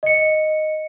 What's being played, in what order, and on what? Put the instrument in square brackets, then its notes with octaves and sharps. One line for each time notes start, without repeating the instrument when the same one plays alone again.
[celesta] D#5 C#7